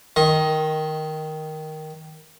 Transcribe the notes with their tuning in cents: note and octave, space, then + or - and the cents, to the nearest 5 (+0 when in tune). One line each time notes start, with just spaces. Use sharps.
D#3 +0 D#5 +15 C6 +45